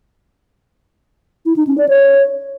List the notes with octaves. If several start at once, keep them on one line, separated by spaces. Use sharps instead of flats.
E4
D#4
C#4
D5
C#5